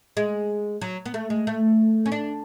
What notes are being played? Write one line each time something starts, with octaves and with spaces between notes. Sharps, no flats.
G#3
F#3
B3
A3
G#3
A3
C#4
D4